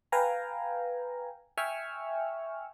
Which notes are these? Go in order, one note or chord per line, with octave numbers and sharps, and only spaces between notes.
B4 F5 G5 G#5 A#5
E5 G5 G#5 C#6 E6 F6